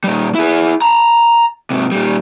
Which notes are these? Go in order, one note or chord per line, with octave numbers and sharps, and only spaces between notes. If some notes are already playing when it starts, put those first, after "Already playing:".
A#2 G3
E4 G#4
A5 A#5
G#2 C3
A#2 G3